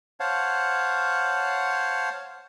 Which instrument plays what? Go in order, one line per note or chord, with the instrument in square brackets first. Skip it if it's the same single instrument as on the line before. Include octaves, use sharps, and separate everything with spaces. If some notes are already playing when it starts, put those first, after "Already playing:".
[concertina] C5 C#5 F5 F#5 A5